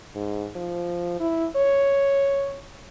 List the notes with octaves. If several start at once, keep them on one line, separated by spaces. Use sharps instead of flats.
G#2
F3
E4
C#5